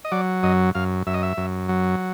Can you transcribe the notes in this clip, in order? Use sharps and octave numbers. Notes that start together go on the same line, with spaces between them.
D#5
F#3 D5
F#2 D#5
F#2 F5
F#2 E5
D#5
E5
F#2
F#3